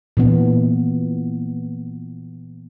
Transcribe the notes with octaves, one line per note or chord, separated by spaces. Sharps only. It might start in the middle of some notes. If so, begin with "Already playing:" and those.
A#2 E3 B3